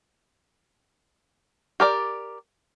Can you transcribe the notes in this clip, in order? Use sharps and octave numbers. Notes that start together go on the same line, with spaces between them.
G4 A#4 D5